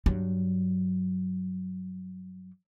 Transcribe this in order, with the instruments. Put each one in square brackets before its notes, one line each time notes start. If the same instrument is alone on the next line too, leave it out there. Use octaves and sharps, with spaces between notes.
[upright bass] G2 F#3